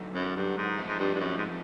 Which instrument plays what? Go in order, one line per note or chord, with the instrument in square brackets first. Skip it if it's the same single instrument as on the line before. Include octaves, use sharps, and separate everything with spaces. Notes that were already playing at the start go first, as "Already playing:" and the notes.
Already playing: [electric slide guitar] D3 F#3 B3 D#4 F#4
[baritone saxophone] F#2
G2
G#2
[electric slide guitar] F3 A3 C4 D#4
[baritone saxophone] G#2
G2
G2
F#2
G#2